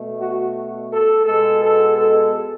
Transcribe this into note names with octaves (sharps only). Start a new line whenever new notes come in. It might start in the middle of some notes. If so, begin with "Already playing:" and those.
Already playing: B2 A3
F#4
A4
B2 G#3 B3 A4
A4
A4